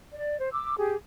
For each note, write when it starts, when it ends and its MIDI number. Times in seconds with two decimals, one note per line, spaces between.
0.14 0.37 74
0.39 0.49 72
0.52 0.77 86
0.52 0.77 88
0.77 0.95 67
0.77 0.95 68